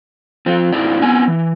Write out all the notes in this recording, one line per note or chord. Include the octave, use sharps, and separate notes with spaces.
F3 C4
G#2 C4 E4 D5
B3 C4 G#5
E3